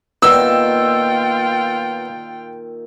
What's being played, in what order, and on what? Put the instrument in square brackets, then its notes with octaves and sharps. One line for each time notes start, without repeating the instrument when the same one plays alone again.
[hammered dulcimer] A#2 D#3 [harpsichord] B3 [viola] F4 G5 [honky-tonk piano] E6